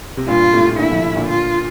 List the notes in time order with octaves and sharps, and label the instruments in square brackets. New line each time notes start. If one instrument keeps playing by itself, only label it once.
[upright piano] C3
[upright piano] G2 A#2 [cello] F4
[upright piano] A2 C3
[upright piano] A#2 D3 [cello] E4
[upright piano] D3 F3
A#2 D3
[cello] F4